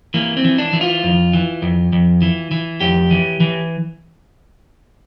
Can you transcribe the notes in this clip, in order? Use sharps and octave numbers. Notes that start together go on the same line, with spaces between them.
E3 A#3
C4
E3
D4
E3
F4
F2
E3
F2
F2
E3
E3
F2 G4
E3
E3